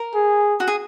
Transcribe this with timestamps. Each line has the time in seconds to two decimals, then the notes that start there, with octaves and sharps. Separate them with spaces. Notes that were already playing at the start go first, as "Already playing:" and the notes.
Already playing: A#4
0.14 G#4
0.60 F#4
0.68 G#4